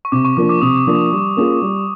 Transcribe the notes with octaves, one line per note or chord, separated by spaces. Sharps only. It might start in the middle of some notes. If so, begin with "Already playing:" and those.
C#6
C3 D6
C#6
F3 A#3 D4 D6
D6
C3 D#6
F3 A#3 D4
G3
A#3 C#4 F4 G#4
G3